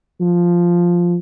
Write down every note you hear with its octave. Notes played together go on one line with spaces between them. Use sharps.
F3